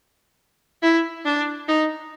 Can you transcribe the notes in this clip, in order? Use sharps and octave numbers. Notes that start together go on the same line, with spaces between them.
E4
D4
D#4